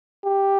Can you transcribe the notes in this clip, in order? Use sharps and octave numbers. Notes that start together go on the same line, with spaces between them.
G4